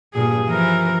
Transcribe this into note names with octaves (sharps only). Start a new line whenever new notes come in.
G2 A#2 G#4
E3 F3 A#4